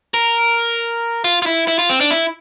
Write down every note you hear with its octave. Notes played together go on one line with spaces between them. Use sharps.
A#4
F4
F4
E4
E4
F4
C4
D4
E4